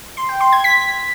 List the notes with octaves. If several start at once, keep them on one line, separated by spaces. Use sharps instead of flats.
C6
G5
C6
G#6
B6